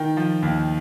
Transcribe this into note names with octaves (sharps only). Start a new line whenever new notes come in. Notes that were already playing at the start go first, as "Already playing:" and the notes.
Already playing: D#3 G5
F3
D#2